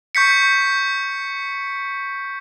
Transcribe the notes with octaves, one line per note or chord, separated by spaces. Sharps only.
C#6 G6 B6 C#7